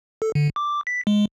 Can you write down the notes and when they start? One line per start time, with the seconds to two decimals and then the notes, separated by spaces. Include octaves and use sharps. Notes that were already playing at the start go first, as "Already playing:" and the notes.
0.22 A4
0.35 D3
0.56 D6
0.87 B6
1.07 G#3